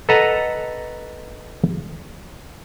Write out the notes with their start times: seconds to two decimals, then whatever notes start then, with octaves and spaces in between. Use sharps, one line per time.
0.09 A4 B4 D#5 F#5 A5 A#5